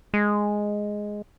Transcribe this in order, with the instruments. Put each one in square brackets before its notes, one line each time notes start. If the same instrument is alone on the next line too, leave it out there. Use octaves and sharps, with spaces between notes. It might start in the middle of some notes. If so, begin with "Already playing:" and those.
[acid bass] G#3